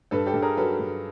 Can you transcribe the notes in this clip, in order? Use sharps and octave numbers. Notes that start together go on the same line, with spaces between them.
G2 A4 B4
G4 A4
G2
G#4 A#4
F#3 A4 B4
G2